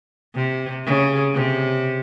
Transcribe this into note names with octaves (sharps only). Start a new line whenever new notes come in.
C3
C#3
C3